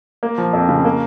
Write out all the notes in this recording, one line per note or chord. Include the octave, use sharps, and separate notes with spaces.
A#3
F3
F2
C#3
A#3